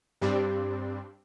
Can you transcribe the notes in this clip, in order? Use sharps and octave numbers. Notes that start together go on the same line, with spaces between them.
G2 G3 C4 D4